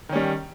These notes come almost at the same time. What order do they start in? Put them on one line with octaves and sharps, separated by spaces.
D#3 C#4 G3